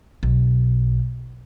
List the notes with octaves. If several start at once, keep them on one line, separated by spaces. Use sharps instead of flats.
B1